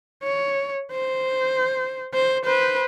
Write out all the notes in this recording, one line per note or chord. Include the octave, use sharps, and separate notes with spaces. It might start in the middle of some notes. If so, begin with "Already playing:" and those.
C#5
C5
C5
B4 C5